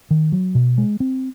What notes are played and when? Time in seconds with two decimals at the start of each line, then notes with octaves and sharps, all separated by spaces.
0.11 D#3
0.32 F#3
0.55 B2
0.78 G#3
1.00 C4